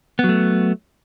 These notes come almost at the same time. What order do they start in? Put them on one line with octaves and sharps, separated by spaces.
B3 F#3 A3